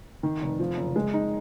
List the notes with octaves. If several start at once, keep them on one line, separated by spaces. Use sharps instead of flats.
D#3
F1
F3
F#1
G#3
D#4